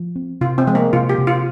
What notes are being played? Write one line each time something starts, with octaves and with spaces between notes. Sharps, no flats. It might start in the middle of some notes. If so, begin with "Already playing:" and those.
Already playing: F3
C4
C3 F4
C4
F3 G#3
A#3
C3 F4
G4
C3
F4